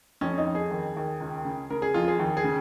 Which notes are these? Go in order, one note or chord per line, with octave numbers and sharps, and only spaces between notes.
F2 C#4
D#4
F2
G#4
D#2
D#2
C#2
C#3
C#3 A#4
G#4
F2 F4
G#4
D#2
G#4
C#3